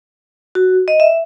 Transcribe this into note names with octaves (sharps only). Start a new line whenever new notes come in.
F#4
D#5
E5